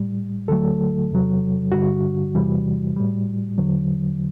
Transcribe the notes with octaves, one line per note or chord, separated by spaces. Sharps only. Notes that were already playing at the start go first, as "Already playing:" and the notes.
Already playing: A2 G3
D2 D3 F#3 A3 A4
E2 C3 F#3
G2 D3 G3 F#4
E2 C3 E3 G3
A2 G3
E2 D3 F#3